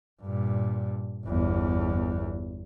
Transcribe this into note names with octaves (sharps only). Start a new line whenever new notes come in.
G2 A#2
G1 E2